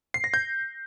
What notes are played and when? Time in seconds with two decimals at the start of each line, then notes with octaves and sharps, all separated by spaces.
0.14 C7
0.24 A#6
0.34 G6